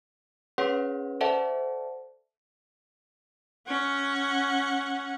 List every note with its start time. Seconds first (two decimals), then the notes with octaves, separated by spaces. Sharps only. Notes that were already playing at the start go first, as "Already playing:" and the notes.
0.58 C#4 G#4 B4 C#5 F#5 C6
1.21 A4 C5 D5 E5 F#5 A5
3.68 C#4 F#5